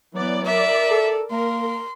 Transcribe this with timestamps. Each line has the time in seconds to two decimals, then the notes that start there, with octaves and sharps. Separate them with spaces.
0.15 E3 F#3 B3 D5
0.46 A#4 D5 E5
0.91 A4
1.31 A#3 A#4 C6